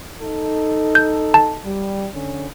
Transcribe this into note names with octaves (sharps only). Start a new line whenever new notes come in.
D#4 A4
G6
A5
G3
D3 C#4